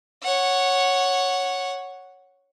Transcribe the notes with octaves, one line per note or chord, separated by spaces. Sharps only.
C#5 F#5